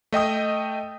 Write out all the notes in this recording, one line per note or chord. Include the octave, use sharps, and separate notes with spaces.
A3 D#5 G5 D#6